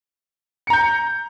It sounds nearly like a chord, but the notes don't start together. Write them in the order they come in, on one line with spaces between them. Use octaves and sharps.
C#7 A#5 G6